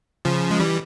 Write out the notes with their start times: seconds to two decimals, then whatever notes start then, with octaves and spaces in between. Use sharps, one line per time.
0.25 C#3 F3
0.51 G#3
0.60 E3 G3